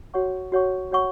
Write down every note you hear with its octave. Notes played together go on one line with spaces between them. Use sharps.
F#4 C#5 F#5 C#6
F#4 C#5 F#5 C#6
F#4 C#5 F#5 C#6